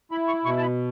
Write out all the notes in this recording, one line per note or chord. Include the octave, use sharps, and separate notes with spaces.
E4 B5
C#6
B2 C#6
A5
B5